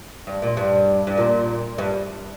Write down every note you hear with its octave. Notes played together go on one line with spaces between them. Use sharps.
G2
A#2
G2
G2
A#2
G2